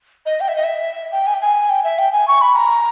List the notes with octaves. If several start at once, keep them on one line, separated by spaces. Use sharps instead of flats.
D#5
G5
E5
D#5
E5
G5
G#5
G5
G#5
G5
E5
G5
G#5
C#6
B5
A#5